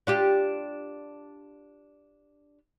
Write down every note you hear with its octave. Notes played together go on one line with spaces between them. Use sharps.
D4 F4 G4